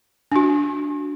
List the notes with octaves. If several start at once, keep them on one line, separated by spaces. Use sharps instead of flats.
D4 F#4